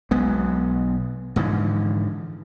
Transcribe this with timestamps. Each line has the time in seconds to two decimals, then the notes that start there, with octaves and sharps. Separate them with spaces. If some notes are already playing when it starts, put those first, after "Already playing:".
0.11 B1 G#3 B3
1.36 G#2 D3 E3 F3